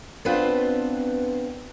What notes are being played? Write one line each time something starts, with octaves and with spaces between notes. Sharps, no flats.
B3 C4 D4 F4 B4 C5